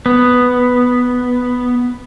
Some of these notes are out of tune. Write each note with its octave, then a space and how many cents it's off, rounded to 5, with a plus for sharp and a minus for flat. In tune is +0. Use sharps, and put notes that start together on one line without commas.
B3 +5